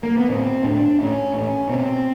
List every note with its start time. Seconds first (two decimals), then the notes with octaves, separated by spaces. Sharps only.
0.03 A#3
0.17 B3
0.29 A2 C4
0.64 A2 D4
0.99 A2 C#4
1.34 A2
1.69 B2 C4